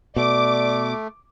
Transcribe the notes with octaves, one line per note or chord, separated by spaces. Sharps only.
B2 A3 D5 D6